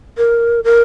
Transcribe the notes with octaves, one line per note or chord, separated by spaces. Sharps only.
A#4
A#4